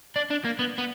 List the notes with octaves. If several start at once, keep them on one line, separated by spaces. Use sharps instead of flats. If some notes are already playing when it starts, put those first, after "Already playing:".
D4
D4
A#3
B3
B3